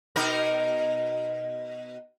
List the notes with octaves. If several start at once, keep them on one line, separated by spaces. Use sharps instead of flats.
B2 D#4 A#4